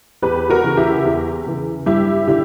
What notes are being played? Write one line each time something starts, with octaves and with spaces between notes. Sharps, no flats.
E2 G4 B4
F#4 A#4
C#3 E3
E4 G4
E2
C#3 E3
G2 E4 G4
D3 E4 G4